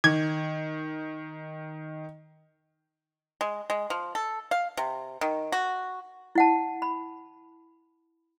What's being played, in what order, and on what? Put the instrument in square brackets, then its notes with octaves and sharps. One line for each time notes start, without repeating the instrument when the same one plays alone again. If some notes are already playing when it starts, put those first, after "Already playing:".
[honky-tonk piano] D#3 [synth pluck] G#6
[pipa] G#3
G#3
F3
A4
F5
C3
D#3
F#4
[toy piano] E4 F#5 A5
B5